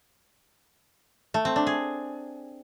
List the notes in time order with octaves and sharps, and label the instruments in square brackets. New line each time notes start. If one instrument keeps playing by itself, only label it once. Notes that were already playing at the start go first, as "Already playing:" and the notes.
[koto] A3
C4
D4
G#4